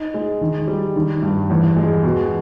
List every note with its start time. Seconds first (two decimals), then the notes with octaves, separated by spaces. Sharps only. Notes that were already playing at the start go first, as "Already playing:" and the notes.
Already playing: D#4
0.14 G#3
0.41 D#3
0.67 G3
0.96 D#3
1.22 G2
1.50 E2
1.76 G#3
2.04 B2